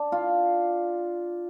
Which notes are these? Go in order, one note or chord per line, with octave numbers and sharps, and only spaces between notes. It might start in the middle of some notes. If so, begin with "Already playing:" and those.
Already playing: D4
F4